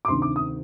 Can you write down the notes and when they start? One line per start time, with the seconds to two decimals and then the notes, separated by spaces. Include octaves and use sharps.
0.05 D6
0.08 D2 C3 D#3 C6
0.22 D6
0.36 D#6